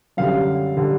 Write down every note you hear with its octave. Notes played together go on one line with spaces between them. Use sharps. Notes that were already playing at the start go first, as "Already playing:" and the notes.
F#2 D3 G3 F5
D3 G3